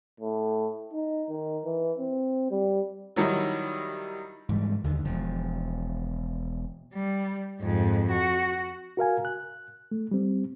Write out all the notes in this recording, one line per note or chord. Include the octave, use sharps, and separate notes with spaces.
A2
D#4
D#3
E3
C4
G3
D#3 F#3 G3 D#4 E4
G#2 E3 G3
D#2 D3 D#3
E1 F3
G3
F2 G#2
F#4
F#4 A#4 F5 G#5
F#6
A3
G3 C4